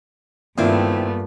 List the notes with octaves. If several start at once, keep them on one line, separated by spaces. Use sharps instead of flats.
G2 A#2 D#3 A3 B3 C4 E4